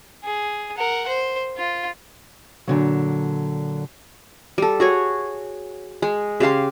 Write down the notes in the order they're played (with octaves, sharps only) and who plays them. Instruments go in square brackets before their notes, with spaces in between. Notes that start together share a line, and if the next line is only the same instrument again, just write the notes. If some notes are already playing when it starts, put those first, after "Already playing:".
[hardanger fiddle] G#4
A#4 F#5
C5
F4
[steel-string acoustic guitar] A#2 D3 F#3
[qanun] G3 A4
F#4 G#4 C#5
G#3
C#3 G4 F5 C6